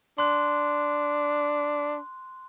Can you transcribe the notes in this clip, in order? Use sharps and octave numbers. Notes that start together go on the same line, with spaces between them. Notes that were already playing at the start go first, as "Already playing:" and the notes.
D4 C6 F#6